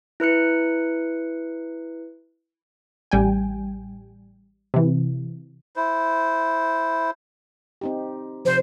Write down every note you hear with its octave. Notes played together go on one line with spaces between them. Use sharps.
E4 B4 F#6 C#7
A1 G3 G5 G#5
C3 E3
E4 C5
C4 D#4 G4
C3 F3 C5